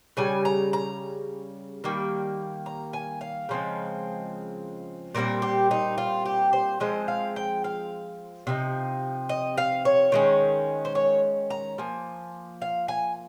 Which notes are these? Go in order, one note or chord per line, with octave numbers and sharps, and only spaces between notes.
C#3 G3 G#5
A#5
A#5
D#3 G3 A#3
A#5
G#5
F5
C#3 F3 G#3 C4
A#2 G3 C4 A#4
G4
D#4
F4
G4
C5
F3 G#3 C4 D#5
F5
G5
F5
C3 F3 A#3 D#4
D#5
F5
C#5
D#3 G#3 C#4
C5
C#5
A#5
F3 A#3 G#5
F5
G#5